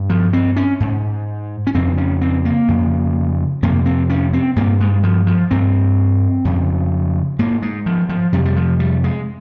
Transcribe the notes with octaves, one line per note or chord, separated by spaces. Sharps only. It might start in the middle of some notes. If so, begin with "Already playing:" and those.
Already playing: G2
F3
C4
C#4
G#2
C#4
F2 C#3 C4
C#4
C4
A#3
F2 C#3
F2 C3 A#3
C4
C#4
C4
G2 A#3
G#3
F3
F3
G2 C4
F2 C#3
G#2 A#3
G#3
F3
F3
F2 C3 G3
G3
F3
G3
G#3